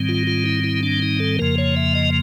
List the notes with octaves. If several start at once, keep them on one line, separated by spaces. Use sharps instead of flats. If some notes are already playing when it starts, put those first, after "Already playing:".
Already playing: G#2 D#3 G3 C4
F4
F4
E4
E4
D4
D#4
A4
F2 C#3 F3 A#3 A#4
C#5
E5
D#5